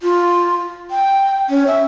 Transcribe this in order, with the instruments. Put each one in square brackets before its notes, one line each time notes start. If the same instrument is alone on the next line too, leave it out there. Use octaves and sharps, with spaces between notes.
[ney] F4
G5
C#4
E5